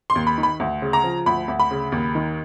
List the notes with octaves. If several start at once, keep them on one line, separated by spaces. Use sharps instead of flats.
C6
D#2
B5
D#3
B5
D2
C#3
A#5
F3
D2 B5
D2
B5
C#3
D#2
D#3